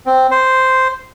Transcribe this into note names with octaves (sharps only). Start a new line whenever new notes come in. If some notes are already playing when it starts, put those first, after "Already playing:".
C4
C5